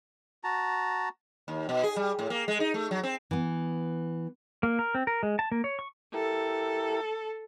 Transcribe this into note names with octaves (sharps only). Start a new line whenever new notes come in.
F#4 A5 A#5
D#2
B2
G#4
G3
A2
A#3
G#3
D#4
A3
F#3
C4
E3 B3
A#3
A#4
C4
A#4
G#3
A5
A#3
C#5
C#6
E4 G4 A4 A#4